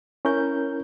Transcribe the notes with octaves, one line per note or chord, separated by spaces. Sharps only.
C#4 E4 A#4 G6